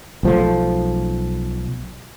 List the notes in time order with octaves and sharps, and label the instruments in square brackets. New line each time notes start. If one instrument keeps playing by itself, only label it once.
[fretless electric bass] B1 F3 A3